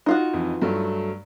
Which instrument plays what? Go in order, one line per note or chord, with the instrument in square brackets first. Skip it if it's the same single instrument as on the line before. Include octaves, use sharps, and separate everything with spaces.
[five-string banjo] D#4 F4 F#4
[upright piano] F2 E3
G2 F#3 A3